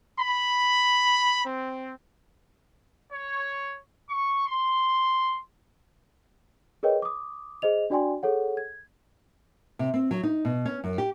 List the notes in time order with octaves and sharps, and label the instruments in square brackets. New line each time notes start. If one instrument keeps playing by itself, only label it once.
[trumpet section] B5
C4
C#5
C#6
C6
[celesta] G#4 A#4 B4 C#5 D#5 G5
D6 D#6
G#4 C5 D#5 F7
D4 F#4 D5 G5 G#5 C6
G#4 A4 C#5 F#5
G#6
[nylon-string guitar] C3
C4
F#3
D#4
B2
C#4
F#2
G4